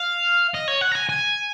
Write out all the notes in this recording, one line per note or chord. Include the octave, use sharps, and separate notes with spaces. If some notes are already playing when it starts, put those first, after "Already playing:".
Already playing: F5
D#5
C#5
F#5
A#5
G#5
G#5